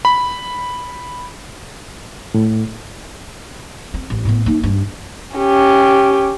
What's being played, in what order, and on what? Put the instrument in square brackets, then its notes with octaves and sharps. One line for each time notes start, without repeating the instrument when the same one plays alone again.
[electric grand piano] B5
[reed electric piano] A2
[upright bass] C4
A1
A2 B3
A#3 D#4
G2
[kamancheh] C#4 G4